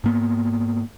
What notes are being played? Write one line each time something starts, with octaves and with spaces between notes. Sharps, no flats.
G#2 A#3 B3